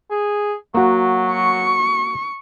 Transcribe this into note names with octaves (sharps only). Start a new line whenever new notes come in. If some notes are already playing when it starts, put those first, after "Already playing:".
G#4
F#3 A#3 F#4
C#6